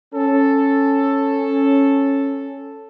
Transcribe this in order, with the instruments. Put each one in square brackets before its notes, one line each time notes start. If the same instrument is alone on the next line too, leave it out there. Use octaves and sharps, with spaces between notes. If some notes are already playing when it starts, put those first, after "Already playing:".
[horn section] C#4 A4